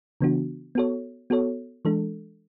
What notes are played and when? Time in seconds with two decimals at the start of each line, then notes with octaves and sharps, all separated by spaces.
0.21 C#3 E3 B3 D4 F#4
0.75 B3 F#4 A4 C#5
1.30 B3 F#4 A4 C#5
1.85 E3 G#3 D4 A4